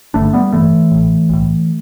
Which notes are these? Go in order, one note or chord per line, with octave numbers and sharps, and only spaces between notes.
G1 G2 D3 A3 D4
G3 B3
A1 G2 D3 E3 A3
A1 A2
B1 A2